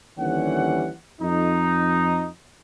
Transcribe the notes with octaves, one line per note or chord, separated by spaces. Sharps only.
D#2 D3 E3 G3 C#4 F#5
F2 D#4